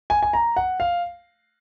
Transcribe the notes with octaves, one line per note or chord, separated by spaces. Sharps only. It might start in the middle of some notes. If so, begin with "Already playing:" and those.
G#5
G#5
A#5
F#5
F5